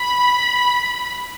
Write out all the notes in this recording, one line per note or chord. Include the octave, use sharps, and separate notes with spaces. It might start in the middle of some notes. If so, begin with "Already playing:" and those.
Already playing: B5